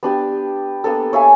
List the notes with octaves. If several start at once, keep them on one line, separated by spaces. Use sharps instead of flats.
B3 D4 G4
A#3 B3 D4 A4
C#5 E5 F5 G#5